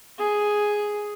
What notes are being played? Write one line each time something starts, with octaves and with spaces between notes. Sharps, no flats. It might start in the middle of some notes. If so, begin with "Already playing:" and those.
G#4